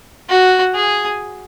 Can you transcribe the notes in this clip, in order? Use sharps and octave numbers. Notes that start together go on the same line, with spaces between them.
F#4
G#4